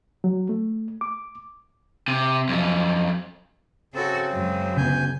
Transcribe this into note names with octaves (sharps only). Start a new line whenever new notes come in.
F#3
A3
D6
C3
F2 F#3
C#3 C4 F#4 A4
F#2 G#3
D2 C#3 B3 G#5 G6